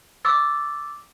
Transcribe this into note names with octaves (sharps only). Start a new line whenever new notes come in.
C#6 D6 E6 A6